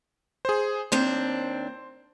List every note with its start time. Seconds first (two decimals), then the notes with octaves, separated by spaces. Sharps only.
0.45 G#4 C5
0.92 D#2 C4 D4 C5